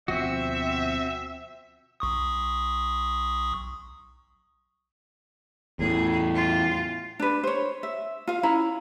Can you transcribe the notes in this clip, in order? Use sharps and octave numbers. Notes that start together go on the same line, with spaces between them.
D2 B2 F3 C4 F#4 E5
B1 C#6 D#6
E2 A2 G#4
F4
D4 B4
C5 C#5
E5
F4 F5
C#4 E4 A#5